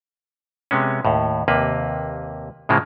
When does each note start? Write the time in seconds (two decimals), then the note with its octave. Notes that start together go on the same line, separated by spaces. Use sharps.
0.71 C3 G#3 B3 C#4
1.05 D#2 A2
1.48 D#2 C3 A#3 B4
2.69 A2 C#3 F3 G#3 A#3